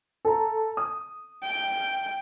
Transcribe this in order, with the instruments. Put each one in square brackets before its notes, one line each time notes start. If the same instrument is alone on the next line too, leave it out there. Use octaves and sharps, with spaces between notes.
[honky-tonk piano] A4 A#5
D#6
[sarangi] G5